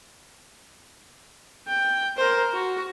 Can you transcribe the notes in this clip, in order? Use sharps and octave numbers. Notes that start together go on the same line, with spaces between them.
G5
A#4 C5
F#4